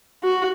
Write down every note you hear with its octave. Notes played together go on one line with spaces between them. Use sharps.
F#4